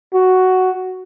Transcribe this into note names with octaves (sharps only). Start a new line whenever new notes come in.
F#4